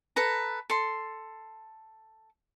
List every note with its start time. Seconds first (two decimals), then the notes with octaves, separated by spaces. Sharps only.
0.16 A4 B4 A#5
0.70 A4 C6